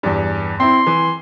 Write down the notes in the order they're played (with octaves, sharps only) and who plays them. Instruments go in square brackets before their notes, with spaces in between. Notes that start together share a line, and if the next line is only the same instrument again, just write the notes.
[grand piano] E2 G2
[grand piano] C4 E4 [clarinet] C6
[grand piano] E3